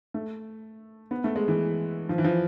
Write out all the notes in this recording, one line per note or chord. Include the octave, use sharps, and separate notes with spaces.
A3
B3
A3
G#3
E3
F3
E3
F3